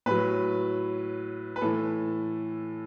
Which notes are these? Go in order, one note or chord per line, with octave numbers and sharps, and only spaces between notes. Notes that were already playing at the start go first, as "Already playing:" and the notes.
A2 F#3 B4
B4
A2 E3 A4